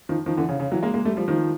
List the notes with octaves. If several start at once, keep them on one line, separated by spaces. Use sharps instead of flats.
D#3 F3
D#3 F3
D3 E3
C#3
C#3
E3 F#3
G#3 A#3
G#3 A#3
G3 A3
F3 G3
D#3 F3